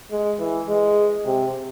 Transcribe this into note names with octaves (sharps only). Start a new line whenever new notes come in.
G#3
E3
G#3
C3